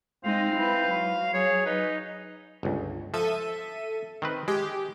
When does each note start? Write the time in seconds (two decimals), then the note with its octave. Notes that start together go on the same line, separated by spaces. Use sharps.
0.24 G#3 C4 D#4 F5
0.56 E4 B4
0.89 F#3
1.34 G#4 C#5
1.66 D#4 B4
2.63 G1 C#2
3.14 F3 A4 E5 D#7
4.22 D#3 C4 B4
4.48 G#3 G4